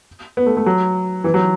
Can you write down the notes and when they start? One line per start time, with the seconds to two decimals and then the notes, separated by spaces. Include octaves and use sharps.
0.37 B3
0.46 A3
0.57 A3
0.66 F#3
1.24 E3
1.34 F#3